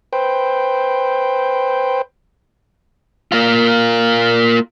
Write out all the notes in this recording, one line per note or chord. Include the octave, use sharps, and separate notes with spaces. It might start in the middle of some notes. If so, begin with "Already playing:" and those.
B4 C5 G5
A#3 F4